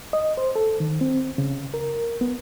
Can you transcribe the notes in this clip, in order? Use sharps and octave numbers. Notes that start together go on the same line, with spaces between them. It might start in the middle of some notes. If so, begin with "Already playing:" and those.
D#5
C5
A4
D#3
C4
C#3
A#4
B3